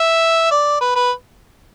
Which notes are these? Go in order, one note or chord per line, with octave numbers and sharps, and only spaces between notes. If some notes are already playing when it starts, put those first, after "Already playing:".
Already playing: E5
D5
B4
B4